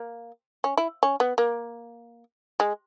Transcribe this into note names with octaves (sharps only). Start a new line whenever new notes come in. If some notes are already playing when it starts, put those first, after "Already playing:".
Already playing: A#3
C#4
E4
C#4
B3
A#3
G#3